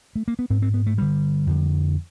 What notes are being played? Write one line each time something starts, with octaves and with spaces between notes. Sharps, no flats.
A3
A#3
B3
G#2 C4
C4
B3
A3
G2 D3 G3
F2 D3